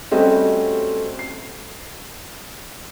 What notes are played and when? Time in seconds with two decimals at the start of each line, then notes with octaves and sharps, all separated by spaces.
0.11 G3 A3 C4 C#4 F#4 D#5
1.19 C7